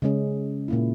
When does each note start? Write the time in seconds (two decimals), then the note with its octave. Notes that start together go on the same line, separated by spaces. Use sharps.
0.02 C#3 G#3 C#4 G#4
0.68 A#2 A#3 E4